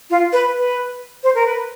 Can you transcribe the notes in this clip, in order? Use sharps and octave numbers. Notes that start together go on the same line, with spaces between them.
F4
B4
B4
C5
A#4
B4